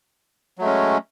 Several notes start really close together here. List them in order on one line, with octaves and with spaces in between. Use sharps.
F#3 A3 G#3 C#4